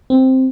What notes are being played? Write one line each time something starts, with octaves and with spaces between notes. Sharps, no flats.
C4